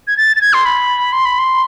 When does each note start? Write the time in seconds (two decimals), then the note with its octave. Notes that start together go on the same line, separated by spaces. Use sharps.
0.07 G#6
0.17 A6
0.36 A6
0.41 G#6
0.53 C6
0.65 B5
1.13 C6
1.25 B5
1.38 C6